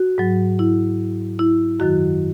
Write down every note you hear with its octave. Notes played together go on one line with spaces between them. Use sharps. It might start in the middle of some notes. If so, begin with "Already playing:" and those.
Already playing: F#4
G#2 F#3
E4
E4
F#2 D#3 F#3 F#4